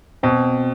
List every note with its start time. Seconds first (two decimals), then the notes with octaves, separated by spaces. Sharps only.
0.23 B2 C4